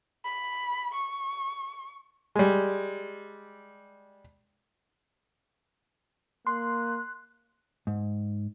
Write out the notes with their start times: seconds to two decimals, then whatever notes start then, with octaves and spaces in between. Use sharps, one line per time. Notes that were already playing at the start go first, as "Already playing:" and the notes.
0.25 B5
0.94 C#6
2.35 G3 G#3
6.47 A#3 C6 F#6
7.87 G#2